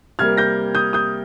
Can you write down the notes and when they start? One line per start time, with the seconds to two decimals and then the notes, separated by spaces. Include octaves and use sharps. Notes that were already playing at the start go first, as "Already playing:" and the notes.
0.19 C3 G3 A#3 F6 G#6
0.37 G6 A#6
0.75 D#6 G6
0.93 D#6 G6